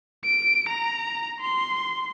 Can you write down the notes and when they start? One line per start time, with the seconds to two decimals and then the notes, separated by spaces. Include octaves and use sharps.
0.24 D7
0.69 A#5
1.41 C6